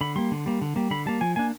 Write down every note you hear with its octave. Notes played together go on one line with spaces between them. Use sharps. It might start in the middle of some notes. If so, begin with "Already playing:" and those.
D3 B5
G3 A#3 C6
D3
G3 A#3
D3
G3 A#3
D3 B5
G3 A#3 A5
F3 G#5
A#3 D4 G#5